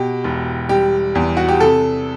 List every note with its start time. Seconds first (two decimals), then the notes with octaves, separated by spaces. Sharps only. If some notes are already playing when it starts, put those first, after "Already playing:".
Already playing: B2 G4
0.24 E1
0.69 G3 G4
1.15 E2
1.37 F#4
1.48 G4
1.60 C3 A4